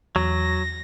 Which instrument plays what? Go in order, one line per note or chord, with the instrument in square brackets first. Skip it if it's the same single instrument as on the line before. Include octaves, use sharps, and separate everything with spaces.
[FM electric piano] E2 [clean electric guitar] F#3 [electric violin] A#6